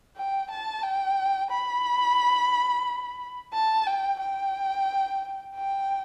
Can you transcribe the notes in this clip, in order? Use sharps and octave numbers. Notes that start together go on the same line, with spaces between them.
G5
A5
G5
B5
A5
G5
G5
G5